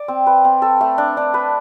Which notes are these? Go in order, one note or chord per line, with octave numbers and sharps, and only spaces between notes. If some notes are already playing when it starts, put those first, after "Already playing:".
Already playing: D5
C4
B4
C4
A4
A3
D4
D4
B4